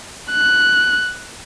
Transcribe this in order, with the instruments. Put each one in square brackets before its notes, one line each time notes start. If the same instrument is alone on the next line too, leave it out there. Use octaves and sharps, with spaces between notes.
[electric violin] F#6